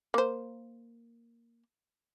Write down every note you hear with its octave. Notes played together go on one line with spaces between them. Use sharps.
A#3 C5